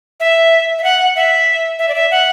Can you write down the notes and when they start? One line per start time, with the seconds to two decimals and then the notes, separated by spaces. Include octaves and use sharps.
0.20 E5
0.78 E5
0.84 F#5
1.16 E5
1.79 E5
1.89 D5
1.95 E5
2.11 F#5